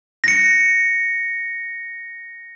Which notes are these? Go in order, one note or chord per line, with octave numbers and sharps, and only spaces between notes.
A#6 C#7